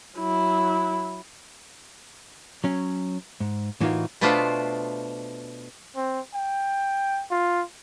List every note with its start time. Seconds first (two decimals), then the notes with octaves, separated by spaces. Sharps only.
0.18 F#3 E4
2.64 F#3 C#4
3.40 G#2
3.81 A2 E3 A#3 D#4 F4 F#4
4.21 B2 A3 B3 D4 F4 C5
5.96 C4
6.34 G5
7.31 F4